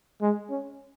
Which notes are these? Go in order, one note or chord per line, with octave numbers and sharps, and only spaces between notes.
G#3
C#4